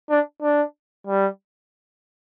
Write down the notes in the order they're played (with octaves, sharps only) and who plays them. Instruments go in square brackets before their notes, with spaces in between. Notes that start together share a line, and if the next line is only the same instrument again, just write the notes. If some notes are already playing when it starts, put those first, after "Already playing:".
[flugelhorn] D4
D4
G3